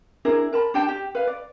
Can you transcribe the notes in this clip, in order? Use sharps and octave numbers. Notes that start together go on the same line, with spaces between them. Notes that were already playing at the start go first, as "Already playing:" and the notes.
D4 E4 G#4 A#4
A#4 A5 B5
D4 G4 G5 A5
G4
B4 F5
D5